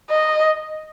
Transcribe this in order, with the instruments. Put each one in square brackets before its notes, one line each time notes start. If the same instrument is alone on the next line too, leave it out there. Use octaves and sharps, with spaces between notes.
[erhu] D#5